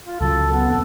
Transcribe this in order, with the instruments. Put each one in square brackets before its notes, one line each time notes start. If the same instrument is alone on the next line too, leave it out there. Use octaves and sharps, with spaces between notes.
[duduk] F4
[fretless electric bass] C#2 C#3 F#3 [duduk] A4
[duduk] B3
[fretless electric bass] E1 C4 [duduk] A4